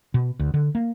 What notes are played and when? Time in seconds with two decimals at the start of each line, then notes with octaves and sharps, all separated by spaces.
0.14 B2
0.39 D2
0.54 D3
0.75 A#3